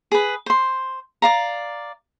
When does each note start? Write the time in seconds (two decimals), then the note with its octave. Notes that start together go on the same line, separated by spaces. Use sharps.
0.12 G#4 B4
0.46 C5 C6
1.22 D5 F5 A#5